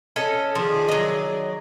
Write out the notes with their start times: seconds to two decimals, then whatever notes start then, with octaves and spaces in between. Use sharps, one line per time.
0.16 C#4 A4 D#5
0.55 D#3 F3 G#4 D5
0.89 F#3 D#5